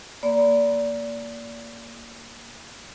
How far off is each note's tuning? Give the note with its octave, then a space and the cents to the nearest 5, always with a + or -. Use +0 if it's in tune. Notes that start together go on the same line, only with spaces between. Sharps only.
A#3 +0 D5 -25 B5 +30